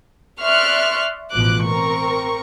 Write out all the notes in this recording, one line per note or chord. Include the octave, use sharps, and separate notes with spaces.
D5 E5 C6 C#6 F6 F#6
A1 B2 F3 D6 F#6
C4 A#4 C#6